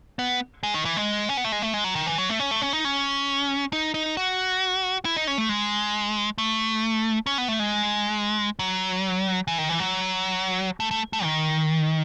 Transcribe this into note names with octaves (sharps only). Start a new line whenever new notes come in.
B3
G#3
D#3
E3
G#3
C#4
B3
A3
G#3
A3
G#3
F#3
D#3
E3
F#3
A3
C#4
A3
C#4
D#4
C#4
D#4
D#4
F#4
E4
D#4
C#4
A3
G#3
A3
C#4
B3
A3
G#3
F#3
E3
D#3
E3
F#3
A3
A3
A3
D#3